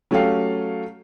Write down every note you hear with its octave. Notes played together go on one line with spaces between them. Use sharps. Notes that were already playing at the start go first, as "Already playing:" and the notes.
F#3 A3 C#4 G4 A4 F5